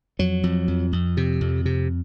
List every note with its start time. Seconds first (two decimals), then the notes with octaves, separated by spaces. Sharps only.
0.19 F2 F#3
0.43 F2
0.68 F2
0.93 F2
1.17 C3
1.41 F2
1.66 C3